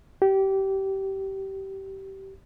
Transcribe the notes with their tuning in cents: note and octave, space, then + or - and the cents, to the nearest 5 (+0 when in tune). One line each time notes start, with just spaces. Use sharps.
G4 -20